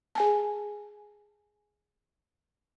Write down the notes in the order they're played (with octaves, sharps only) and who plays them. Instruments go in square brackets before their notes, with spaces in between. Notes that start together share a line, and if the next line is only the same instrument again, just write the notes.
[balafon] G#4 G#5 A5